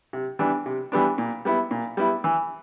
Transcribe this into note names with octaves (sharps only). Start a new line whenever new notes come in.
C3
E3 G3 B3 D4
C3
E3 G3 B3 D4
A#2
G3 B3 E4
A#2
G3 B3 E4
E3